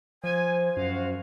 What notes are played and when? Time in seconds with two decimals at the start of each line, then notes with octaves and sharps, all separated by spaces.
0.24 F3 C5 G#5
0.77 F#2 F#4 F5